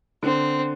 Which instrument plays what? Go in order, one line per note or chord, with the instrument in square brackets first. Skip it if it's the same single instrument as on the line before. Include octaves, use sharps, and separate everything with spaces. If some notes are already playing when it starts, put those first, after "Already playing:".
[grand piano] D3 [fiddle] C4